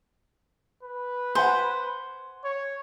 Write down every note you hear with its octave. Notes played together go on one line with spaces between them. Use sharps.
B4
C5 F#5 G#5 C6
C#5